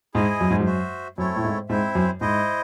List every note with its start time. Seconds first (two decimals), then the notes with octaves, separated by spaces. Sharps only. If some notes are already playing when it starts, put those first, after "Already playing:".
0.14 G#2 E4 G#4 D#5 G#5
0.41 F#2
0.50 G#2
0.60 F#2
0.66 F#4 C5 E5
1.18 F#2 A3 C4 E4 A4 C#5
1.36 A2
1.44 G#2
1.69 G#2 C4 E4 C5 E5
1.95 F#2
2.21 G#2 E4 C5 D#5